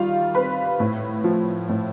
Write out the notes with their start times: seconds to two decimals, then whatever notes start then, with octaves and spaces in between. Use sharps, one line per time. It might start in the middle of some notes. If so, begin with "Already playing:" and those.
Already playing: D#3 G3 F4 F5
0.35 C4 B4 B5
0.80 A2
1.24 F3
1.69 A2